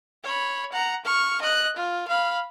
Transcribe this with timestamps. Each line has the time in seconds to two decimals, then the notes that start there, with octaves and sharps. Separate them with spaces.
0.24 C#5 B5
0.73 F#5 A#5
1.05 C#6 F6
1.42 D#5 F#6
1.76 F4
2.08 F5 B5